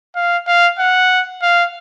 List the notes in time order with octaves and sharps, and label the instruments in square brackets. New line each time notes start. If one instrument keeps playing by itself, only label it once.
[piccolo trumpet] F5
F5
F#5
F5